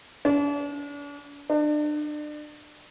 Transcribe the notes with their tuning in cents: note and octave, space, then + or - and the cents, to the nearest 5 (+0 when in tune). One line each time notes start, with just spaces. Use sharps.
D4 -40
D4 +35